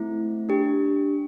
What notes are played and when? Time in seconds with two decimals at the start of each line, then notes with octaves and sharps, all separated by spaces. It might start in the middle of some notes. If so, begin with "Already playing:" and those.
Already playing: A3 C4 E4
0.49 D4 G4